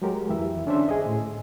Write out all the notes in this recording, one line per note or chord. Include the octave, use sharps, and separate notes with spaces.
F#3 G#3 G4 A#4
F2 E3 E5
D3 C#4 D4 C5 E5
G#4 D#5
A2